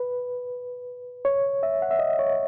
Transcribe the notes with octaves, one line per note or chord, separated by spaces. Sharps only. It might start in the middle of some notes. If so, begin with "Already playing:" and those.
Already playing: B4
C#5
E5
F#5
E5
D#5
C#5